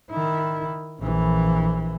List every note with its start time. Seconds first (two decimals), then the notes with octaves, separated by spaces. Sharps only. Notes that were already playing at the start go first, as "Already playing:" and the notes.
0.11 D#3 E4
0.99 A#1 E3